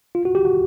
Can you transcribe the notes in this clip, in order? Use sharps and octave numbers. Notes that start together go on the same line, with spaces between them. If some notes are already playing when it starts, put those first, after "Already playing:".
F4
F#4
G4
F#4